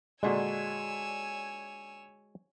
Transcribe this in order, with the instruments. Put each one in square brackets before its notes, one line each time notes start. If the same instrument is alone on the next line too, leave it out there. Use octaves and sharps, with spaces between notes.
[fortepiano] A#2 D3 D4 [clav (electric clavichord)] G#3 F#4 [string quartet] C#5 G#5 E6